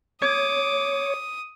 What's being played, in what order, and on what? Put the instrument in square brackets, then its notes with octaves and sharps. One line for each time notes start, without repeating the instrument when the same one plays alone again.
[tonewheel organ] C#5 [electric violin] D6 [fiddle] D#6